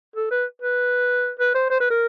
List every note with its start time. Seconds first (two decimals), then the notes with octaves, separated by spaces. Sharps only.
0.16 A4
0.31 B4
0.62 B4
1.40 B4
1.55 C5
1.70 C5
1.80 B4
1.90 A#4